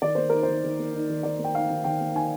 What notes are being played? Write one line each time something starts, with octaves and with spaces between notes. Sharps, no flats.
D#3 D5
A#3 C5
D#4 A#4
C5
D#3
D#3
A#3
D#4
D#3
D#3 D5
A#3
G5
D#4 F5
D#3
D#3 G5
A#3
D#4 G#5